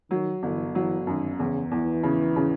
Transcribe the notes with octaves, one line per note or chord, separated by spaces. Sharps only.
D#3 F#3
G1 E3
E3 F#3
F#2 D#3
E2 C#3
E2 E3
C#3
C#3